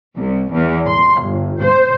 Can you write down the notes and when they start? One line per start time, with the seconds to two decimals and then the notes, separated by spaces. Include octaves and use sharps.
0.18 C2
0.53 E2
0.87 C6
1.20 G1
1.61 C5